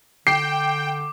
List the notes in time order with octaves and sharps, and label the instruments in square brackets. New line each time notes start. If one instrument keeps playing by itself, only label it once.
[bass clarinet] D3 [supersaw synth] G5 [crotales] D6 [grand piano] C7